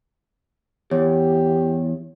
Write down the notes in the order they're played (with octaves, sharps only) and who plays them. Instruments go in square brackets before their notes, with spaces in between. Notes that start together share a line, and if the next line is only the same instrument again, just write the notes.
[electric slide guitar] E2 [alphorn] G4 [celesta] C#5